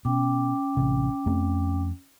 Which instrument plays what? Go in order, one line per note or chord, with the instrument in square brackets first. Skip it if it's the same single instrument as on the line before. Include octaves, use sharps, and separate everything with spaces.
[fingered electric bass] B2 [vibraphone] C#4 G5 D6
[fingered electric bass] A1 C3
F2 A3 C4